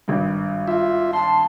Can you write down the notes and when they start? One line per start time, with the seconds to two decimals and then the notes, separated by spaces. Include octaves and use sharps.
0.08 G#1 G2
0.67 F4 E5
1.13 A5 C6